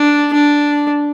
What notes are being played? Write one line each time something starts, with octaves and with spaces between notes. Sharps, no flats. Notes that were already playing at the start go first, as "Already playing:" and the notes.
Already playing: D4
D4